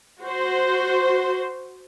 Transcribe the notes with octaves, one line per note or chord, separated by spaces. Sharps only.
F#4 C5